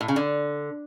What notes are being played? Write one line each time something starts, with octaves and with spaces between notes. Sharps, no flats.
A2
C#3
D3